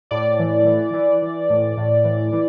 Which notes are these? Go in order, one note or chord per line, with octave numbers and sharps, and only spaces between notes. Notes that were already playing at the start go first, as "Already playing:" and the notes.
A2 D5
E3
E3
E3
E3
A2
A2
E3
E3